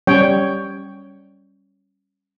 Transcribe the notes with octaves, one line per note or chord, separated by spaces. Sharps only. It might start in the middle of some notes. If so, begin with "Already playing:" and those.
G3 C#4 C#5 G5